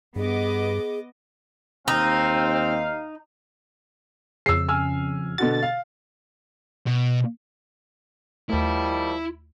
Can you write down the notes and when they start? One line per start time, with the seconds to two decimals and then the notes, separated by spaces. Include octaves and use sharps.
0.16 G2 B3 G#4 D#5 D6
1.88 D#2 C4 D#4 F5
4.46 F2 C#3 E6 C7
4.68 G#5 E6 F6
5.38 B2 D3 F#4 A6
5.63 F5
6.87 B2
8.50 D#2 D#3 F3 G3 A3 E4